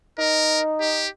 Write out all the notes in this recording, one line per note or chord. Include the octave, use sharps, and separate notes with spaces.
D#4 A#4
G4